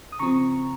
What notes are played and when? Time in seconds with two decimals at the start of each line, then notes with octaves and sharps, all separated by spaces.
0.12 D#6
0.19 C#3 F3 C4 A#5 C#6